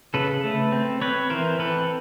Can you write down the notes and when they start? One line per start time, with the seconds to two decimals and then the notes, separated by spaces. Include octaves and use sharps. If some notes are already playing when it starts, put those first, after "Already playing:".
0.14 C#3 A4 B4
0.44 A3
0.72 C4
1.01 C4 B4 C#5
1.30 E3 A#4 C5
1.59 C4 A4 B4